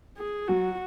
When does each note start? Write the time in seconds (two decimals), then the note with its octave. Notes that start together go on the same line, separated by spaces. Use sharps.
0.18 G#4
0.48 F#3 F#4